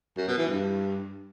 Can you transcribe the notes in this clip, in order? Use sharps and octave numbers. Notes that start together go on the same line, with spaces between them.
F#2
B2
E3
G2